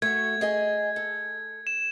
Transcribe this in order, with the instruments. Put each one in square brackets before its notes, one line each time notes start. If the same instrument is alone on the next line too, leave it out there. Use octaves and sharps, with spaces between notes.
[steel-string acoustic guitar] A3 F#4 [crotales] G#6
[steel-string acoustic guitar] G#4 D#5 G#5
A4
[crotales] E7